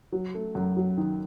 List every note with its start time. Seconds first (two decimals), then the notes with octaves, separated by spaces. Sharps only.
0.12 F#3
0.34 A3
0.55 F#2
0.77 F#3
0.97 D#3